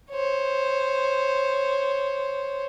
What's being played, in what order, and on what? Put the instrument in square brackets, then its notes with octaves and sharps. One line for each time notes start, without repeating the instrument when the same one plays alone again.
[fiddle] C5 C#5